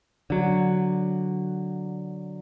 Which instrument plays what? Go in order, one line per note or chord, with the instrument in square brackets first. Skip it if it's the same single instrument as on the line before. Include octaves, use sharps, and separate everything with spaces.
[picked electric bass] D3 F#3